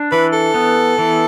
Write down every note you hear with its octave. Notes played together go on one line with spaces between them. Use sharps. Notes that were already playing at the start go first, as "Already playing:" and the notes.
Already playing: D4
E3 B4
A4
B3
E3